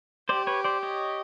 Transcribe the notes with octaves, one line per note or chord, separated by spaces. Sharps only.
G4 C5 D5
B4 C#5
C5 D5
C#5 D#5